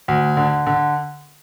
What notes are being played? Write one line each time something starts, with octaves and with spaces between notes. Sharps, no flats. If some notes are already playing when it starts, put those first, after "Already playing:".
D2
D3
D3